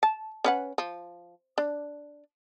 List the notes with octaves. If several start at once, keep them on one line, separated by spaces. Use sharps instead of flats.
A5
C#4 B4 F#5
F3
D4